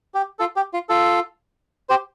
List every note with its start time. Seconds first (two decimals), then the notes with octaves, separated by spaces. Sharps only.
0.14 G4
0.39 F4 A4
0.56 G4
0.74 F4
0.89 F4 A4
1.89 G4 C5